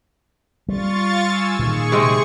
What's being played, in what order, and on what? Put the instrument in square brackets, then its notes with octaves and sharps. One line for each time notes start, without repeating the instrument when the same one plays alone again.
[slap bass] G3 [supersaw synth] F4 C#6 A6
[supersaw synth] G#5 E6
[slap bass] A#2 D#3 [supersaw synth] G#4 C#6
[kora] C3 G#3